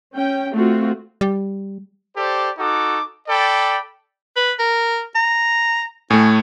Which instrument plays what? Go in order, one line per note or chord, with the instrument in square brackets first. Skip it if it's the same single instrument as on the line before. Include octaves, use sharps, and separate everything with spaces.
[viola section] C#4 G5
A3 C4 F4 F#4
[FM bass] G3
[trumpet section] G4 A4 C5 D5
D#4 F#4 A4 D6
A4 D5 G5 B5
[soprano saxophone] B4
A#4
A#5
[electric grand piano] A2 A3 [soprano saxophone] G#5